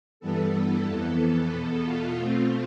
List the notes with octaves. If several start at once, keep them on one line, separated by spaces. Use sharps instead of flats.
G2 E3 G3 B3 A4
A4
F2 E3 B3
E2 B2 B3
F4
B2 A3 C4 F4